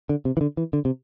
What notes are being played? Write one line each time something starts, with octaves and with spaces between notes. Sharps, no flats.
D3
C3
E3
D3
E3
D3
C3